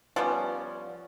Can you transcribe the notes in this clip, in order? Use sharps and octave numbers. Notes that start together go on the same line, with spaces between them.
F3 G3 B3 C#4